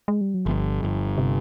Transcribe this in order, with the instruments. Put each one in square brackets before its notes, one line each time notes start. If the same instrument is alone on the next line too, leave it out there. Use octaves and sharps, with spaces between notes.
[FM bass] G#3
G3
F#3
[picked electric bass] G1 [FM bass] F3
[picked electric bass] G1
[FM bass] C3